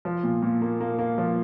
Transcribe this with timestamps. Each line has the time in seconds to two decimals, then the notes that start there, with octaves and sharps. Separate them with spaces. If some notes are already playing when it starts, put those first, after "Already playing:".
0.05 F3
0.24 A#2
0.42 A#2
0.61 A#3
0.80 A#3
0.99 A#3
1.18 F3